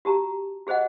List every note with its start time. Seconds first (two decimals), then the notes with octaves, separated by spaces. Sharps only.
0.05 F#4 G4 A5 A#5
0.67 F#4 G#4 C5 D#5 F#5